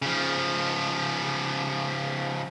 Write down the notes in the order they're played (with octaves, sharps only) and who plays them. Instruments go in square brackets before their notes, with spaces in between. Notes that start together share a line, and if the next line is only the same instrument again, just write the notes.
[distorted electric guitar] C#3 F3